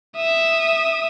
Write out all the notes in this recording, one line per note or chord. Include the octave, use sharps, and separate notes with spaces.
E5 D#6